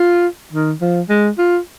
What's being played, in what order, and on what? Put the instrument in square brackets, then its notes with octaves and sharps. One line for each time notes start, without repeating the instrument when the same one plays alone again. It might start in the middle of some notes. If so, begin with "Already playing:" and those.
Already playing: [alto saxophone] F4
D#3
F3
G#3
F4